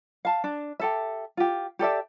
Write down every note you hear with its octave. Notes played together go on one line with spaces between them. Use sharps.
F5 A5
D4
G4 A4 E5
F4 G4
G4 A4 D5 E5